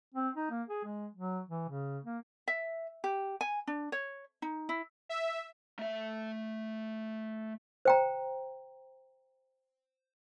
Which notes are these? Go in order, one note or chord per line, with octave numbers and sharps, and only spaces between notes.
C4
D#4
A#3
G#4
G#3
F#3
E3
C#3
A#3
E5
G4
G#5
D4
C#5
D#4
E4
E5
A3 E5
C5 G5 A#5